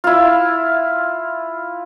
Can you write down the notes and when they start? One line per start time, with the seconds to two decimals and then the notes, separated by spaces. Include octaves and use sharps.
0.04 E4 F4